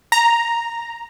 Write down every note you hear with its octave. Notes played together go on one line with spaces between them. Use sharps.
A#5